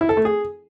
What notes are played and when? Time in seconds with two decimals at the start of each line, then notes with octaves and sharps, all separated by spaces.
0.01 E4
0.09 A4
0.17 A3
0.25 G#4